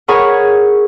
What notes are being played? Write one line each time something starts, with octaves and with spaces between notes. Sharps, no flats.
G#4 A#4 C#5 F#5 B5 C#6